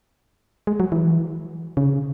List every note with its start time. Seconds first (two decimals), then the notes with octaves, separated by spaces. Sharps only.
0.67 G#3
0.80 F#3
0.92 E3
1.77 C#3